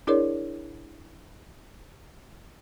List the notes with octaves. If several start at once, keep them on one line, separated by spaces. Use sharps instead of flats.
D4 E4 G#4 A#4 C#5 D5